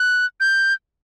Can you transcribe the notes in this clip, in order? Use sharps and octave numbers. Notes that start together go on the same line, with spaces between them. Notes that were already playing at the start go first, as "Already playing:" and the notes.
Already playing: F#6
G6